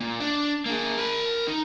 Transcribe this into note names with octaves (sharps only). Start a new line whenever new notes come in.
A#2
D4
A#3 G#4
A#4 B5
D#4